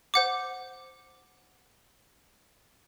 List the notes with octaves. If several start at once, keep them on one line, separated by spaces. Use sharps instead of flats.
C5 F#5 D6